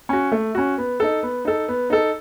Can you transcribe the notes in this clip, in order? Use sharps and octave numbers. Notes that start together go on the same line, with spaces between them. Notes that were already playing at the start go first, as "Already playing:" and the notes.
C#4 F#4
A3
C#4 F#4
B3
D#4 A4
B3
D#4 A4
B3
D#4 A4